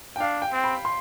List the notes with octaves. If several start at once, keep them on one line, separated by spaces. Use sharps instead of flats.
G5
D4 F5
G5
C4
B5
C6